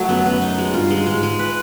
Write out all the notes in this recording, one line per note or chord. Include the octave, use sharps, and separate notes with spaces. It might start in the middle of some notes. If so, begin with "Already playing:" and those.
Already playing: F#3 A3
F#2 B3
B3
D#4
G#3
G2 F4
G#3
G#2 G#3
G#3
B4